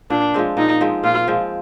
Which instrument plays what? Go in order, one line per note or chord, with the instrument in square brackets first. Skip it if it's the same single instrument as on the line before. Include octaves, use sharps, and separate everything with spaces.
[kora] A#2 [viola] D4
[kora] F3 G#3 C4
[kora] A#2 [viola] D#4
[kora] F3 G#3 C4
[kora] A#2 [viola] F4
[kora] F3 G#3 C4